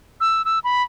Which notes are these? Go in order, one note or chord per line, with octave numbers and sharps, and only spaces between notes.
E6
E6
B5